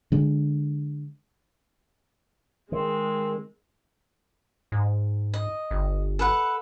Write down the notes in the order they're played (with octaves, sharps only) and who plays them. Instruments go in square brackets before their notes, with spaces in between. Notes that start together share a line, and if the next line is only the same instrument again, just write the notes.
[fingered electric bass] D3 G#3
[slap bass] D#3 [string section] G#3 [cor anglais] C4
[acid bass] G#2
[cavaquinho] D#5
[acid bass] G1
[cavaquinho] A4 B4 F#5